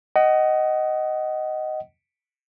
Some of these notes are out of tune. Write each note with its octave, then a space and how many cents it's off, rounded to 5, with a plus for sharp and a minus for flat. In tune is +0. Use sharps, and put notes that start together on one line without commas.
D#5 +0 F#5 +30